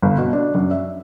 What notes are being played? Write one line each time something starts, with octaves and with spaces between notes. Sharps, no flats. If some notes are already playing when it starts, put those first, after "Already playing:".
G1
B2
D4
F#2
E5